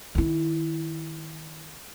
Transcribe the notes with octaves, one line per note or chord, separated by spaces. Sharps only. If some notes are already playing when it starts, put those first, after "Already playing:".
D#3 E4